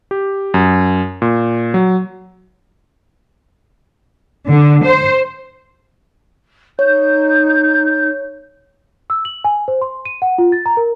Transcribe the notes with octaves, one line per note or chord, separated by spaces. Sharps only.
G4
F#2
A#2
F#3
D3
C5
D#4 C#5 G6
E6
F#7
G#5
C5
C6
D#7
F#5
F4
A6
A#5
A#4